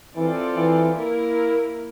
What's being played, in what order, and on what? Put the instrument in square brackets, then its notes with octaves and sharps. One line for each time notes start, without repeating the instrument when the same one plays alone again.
[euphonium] E3 [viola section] C4 F4 A4 D5
[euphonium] E3
[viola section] A#3 E4 A#4